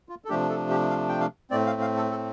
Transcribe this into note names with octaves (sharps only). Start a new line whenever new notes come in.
F4
A4
C3 F3 A3 D4 G4
A4
G4
F5
G5
F5
A2 A3 C4 D5
F5
F5
A4
A4